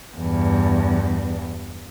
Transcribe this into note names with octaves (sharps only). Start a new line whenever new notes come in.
E2 G2